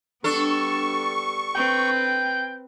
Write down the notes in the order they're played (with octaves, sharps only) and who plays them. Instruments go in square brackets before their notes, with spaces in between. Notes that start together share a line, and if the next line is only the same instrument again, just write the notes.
[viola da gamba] G3 B3 [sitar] D4 A4 [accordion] C#6
[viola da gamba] C4 B4 [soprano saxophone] G5